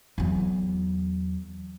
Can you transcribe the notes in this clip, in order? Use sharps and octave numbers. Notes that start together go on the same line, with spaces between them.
E2 F#3